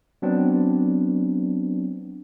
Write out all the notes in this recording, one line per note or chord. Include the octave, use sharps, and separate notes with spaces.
F#3 B3 C4 D4